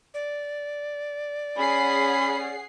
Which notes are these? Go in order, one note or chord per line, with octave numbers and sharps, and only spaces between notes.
D5
C#4 G#4 F#5 B5 C7